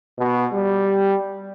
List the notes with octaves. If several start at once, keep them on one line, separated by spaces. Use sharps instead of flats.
B2
G3